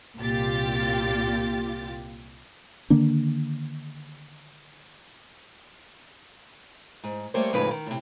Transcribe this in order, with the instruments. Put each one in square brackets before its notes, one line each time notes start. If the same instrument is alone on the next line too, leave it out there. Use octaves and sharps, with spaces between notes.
[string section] C2 A#2 F4 G4 A6
[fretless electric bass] D3 D#3 A#3 D4
[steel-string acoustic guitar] G#2
G3 A3 A#3 C5 C#5
F2 A2 C#3 G#3 D#4 B4
D#3
A2 C3